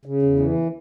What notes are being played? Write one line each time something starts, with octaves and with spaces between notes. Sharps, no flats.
C#3
E2
E3